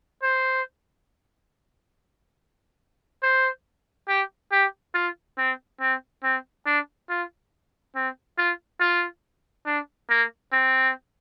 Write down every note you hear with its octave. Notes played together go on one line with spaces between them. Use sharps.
C5
C5
G4
G4
F4
C4
C4
C4
D4
F4
C4
F4
F4
D4
A#3
C4